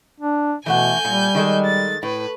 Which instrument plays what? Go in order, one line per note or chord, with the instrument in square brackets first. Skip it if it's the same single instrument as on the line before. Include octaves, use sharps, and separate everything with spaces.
[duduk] D4
[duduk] B2 [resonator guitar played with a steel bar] E3 A3 F#5 [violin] G#5 G6
[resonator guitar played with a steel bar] A#2 [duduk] G3
[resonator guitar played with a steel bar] D#3 G#3 A4
[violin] A6
[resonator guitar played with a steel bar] A2 [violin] B4